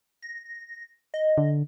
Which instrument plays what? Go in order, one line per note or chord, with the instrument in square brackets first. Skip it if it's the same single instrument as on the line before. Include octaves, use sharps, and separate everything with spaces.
[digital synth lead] A#6
D#5
[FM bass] D3